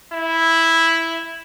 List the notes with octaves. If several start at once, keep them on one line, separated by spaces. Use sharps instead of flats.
E4